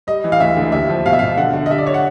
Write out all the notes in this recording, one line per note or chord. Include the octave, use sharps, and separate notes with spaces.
G3 D#5
E3
F5
D2 E5
D3
D#2 E5
F3
B2 F5
E5
B2 F5
D3 F#5
D3
D#5
G3 E5
D5
C#5
F#5